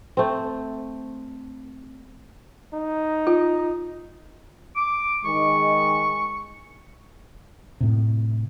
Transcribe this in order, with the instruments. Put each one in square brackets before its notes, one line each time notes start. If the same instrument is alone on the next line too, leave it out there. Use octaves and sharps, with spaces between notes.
[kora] A3 C4
[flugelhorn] D#4
[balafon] F4
[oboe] D6
[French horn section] D#3 G#3 [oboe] C#6
[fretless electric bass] A2 C3